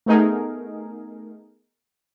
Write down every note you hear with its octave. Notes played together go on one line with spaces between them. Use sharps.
A3 B3 D#4 G#4 A#4